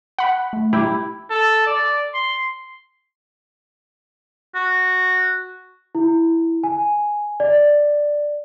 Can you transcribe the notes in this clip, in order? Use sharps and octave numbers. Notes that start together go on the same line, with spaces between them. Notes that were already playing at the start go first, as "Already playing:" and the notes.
F#5 B5
A3
E4 G4
A4
D5
C6
F#4
E4
G#5
D5